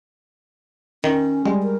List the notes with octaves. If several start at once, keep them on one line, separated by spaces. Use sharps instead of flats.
D#3 C#4
G3 G#3
A#4